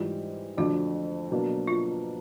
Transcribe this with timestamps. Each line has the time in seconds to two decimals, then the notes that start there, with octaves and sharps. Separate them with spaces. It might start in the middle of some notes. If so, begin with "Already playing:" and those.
Already playing: G#2 E3 G3 F4
0.57 F2 D3 F3 A3 D4 F#4
1.31 B2 F#3 A#3 D4
1.68 F4